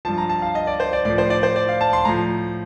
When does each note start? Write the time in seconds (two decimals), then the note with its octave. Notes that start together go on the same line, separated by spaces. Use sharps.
0.05 G2 F3 A5
0.18 A#5
0.29 A5
0.42 F5
0.55 D#5
0.67 D5
0.80 C5
0.93 D5
1.05 A2 F3 D5
1.18 C5
1.30 D5
1.43 C5
1.56 D5
1.69 F5
1.81 A5
1.93 C6
2.05 A2 F3 A#5